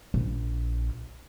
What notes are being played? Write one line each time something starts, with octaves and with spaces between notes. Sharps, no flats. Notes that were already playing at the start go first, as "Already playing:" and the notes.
A#1